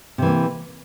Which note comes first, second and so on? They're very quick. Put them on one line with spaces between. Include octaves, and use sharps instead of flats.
C3 E3 A#3